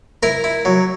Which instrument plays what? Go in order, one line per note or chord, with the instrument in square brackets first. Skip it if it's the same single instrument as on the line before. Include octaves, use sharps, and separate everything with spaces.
[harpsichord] E4 A#4 A#5
E4
F#3